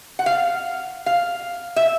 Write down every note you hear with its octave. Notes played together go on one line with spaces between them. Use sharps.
F#5
F5
F5
E5